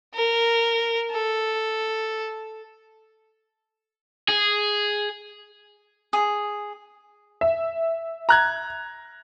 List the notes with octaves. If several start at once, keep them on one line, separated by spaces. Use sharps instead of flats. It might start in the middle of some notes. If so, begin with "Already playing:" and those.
A#4
A4
G#4
G#4
E5
A#5 F#6 G#6